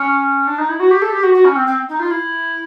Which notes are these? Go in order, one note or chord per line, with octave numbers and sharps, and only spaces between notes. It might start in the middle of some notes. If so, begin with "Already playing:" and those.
Already playing: C#4
D4
D#4
E4
F#4
G4
A4
G4
F#4
F#4
C#4
C4
C4
D#4
F4
E4